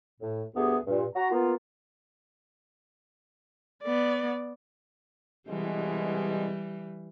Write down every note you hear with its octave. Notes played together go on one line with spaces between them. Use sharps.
A2
D2 G2 A3 B3 G4 G#4
G2 A#2
F#4 A#5
A#3 B3 F4
B3 D5
C2 B2 E3 G3 G#3